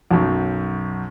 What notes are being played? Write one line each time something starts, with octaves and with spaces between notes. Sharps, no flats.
B1 F#2